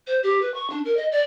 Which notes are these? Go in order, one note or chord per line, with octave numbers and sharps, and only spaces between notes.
C5
G4
B4
C#6
D4
A#4
D#5
D5